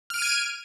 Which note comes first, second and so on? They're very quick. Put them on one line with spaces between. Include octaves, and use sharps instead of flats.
F6 D7 D#7 G#6